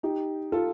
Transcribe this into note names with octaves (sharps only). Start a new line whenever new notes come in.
D#4 G4
F4 A4